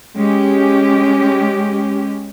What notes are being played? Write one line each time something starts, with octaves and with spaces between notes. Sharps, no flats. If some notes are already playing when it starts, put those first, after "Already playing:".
G#3 C#4 G4